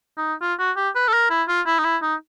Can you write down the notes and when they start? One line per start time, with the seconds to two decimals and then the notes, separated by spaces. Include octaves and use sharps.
0.17 D#4
0.42 F4
0.59 F#4
0.77 G4
0.95 B4
1.08 A4
1.13 A#4
1.30 E4
1.48 F4
1.67 E4
1.79 D#4
1.84 E4
2.02 D#4